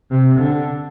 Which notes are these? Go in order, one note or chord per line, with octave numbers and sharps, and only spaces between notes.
C3
D3